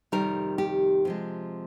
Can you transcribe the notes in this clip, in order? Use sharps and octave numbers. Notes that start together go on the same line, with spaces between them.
F2 C3 D#3 G3 A#4
G4
C3 F3 G#3